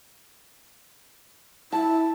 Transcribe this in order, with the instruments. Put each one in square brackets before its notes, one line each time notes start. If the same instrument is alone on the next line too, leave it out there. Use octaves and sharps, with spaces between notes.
[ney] E4 [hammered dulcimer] A5